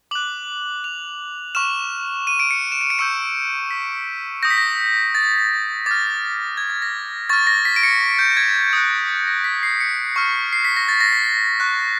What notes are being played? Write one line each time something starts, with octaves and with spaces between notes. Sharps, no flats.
D6 F#6 F#7
F7
C#6 F6 E7
D#7
D7
C#7
E7
D#7
D7
C#6 E6 G6 C#7
B6
D#6 G6 A#6
B6
A#6
A6
D6 F6 A6
G#6
A6
A#6
C#6 F6 A6
A#6
B6
D7
C#7
G6
G#6
D#6 F#6
A6
A#6
B6
C7
C#7
C#6 F6
C7
B6
A#6
A6
A#6
B6
C#6 F#6